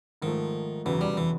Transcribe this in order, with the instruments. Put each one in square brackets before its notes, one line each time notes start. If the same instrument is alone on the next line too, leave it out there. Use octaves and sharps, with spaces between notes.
[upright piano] G#2 F3 A3 [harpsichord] D#3
[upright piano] F1 E2 C#3 F#3 B3 [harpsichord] E3
[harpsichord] G3
E3